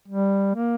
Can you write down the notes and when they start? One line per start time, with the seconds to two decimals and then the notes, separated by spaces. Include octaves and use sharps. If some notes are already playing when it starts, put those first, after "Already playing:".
0.08 G3
0.55 A#3